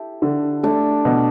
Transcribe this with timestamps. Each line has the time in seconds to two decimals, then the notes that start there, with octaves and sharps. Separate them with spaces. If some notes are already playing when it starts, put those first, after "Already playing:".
Already playing: E4 G4 A4
0.22 D3
0.63 A3 D4
1.05 B2